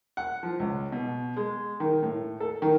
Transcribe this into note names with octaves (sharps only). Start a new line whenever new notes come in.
F#5
F3
C#2
B2
G#3
D#3
A2
A4
D#3